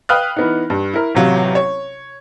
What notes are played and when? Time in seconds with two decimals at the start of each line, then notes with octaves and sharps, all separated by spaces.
0.09 B4 F5 G5 D#6 F6 F#6
0.36 E3 B3 D#4
0.70 G2
0.94 E4 A#4
1.15 A1 C3 F#3 F4
1.55 C#5